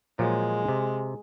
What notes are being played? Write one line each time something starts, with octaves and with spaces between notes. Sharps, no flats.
A#2 F3 F#3 G#3
C3